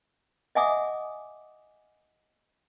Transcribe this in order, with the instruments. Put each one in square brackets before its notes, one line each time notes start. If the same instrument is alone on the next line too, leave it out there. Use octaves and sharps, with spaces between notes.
[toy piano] D#5 E5 F#5 G#5 D6 D#6